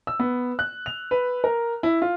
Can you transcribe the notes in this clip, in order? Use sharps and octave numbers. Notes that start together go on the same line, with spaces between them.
E6
B3
F#6
F7
B4
A#4
E4
F4